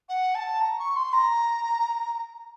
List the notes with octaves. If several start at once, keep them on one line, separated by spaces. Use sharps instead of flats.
F#5
A5
A#5
C#6
C6
A#5